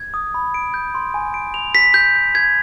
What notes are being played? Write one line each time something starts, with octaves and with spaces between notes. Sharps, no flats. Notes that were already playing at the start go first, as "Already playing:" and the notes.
Already playing: G#6
D#6
B5
D7
G6
C6
G#5
D7
F7
B6
G6
G6
G#6